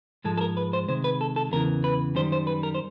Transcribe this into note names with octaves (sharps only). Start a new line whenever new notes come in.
G#2 F3 G#3 A4
A4
A#4
B4
C5
C3 D#3 G#3 C5
B4
A4
A4
E2 C#3 E3 A#4
B4
F#2 D#3 G3 C5
C5
B4
A#4
C5